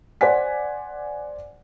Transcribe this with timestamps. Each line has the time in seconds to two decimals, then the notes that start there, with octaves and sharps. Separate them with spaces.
0.21 C5 D5 F#5 G#5 B6